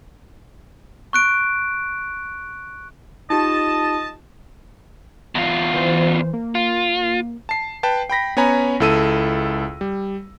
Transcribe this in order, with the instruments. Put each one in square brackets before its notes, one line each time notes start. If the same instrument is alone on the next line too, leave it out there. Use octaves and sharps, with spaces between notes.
[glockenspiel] C#6 F#6 D7
[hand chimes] D#4 F4 G4 [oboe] D#5 [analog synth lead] A5
[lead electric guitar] E2 F4
[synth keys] E3 C5
A#3
[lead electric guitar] F4
[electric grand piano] A5 C7
B4 G5 A5
G5 B5 A#6 B6
B3 C#4 C#5 G#5 A#5 B5
C#2 E4 A4 E6 D#7
G3